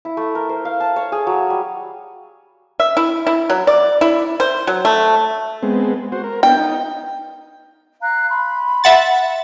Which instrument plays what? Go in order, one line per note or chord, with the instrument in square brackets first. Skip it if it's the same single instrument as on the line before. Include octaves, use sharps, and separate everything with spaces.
[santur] E4
A3
A#4
C5
F5
A5
C#5
G#4
F#3
G3
[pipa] E5
E4
E4
F#3
D5
E4
C5
F#3
A3
[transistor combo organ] G#3 B3 C4
F#4 C5
A#4
[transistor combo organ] B3 D4 [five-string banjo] G5
[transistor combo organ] D#4
[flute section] F5 A#5 F#6
B5 C6
[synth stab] E5 F#5 A6